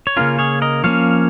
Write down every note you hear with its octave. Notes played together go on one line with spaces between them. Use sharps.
C#5
C#3 A#3 C#4 F4 A#4
G#4 C#5
A#4 D#5
F3 A#3 C#4 C#5 F5